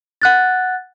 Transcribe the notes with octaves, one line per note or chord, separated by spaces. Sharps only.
F#5 F#6 A6